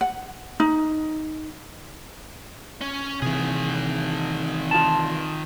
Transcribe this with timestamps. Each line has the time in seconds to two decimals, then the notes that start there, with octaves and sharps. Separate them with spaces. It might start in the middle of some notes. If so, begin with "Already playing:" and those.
0.01 F#5
0.60 D#4
2.81 C#4
3.22 C3 D#3 E3 G#4
4.71 F4 A5